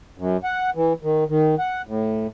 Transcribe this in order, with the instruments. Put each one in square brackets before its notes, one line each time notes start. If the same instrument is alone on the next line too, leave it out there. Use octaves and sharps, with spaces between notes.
[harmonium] F#2
F#5
E3
D#3
D#3
F#5
A2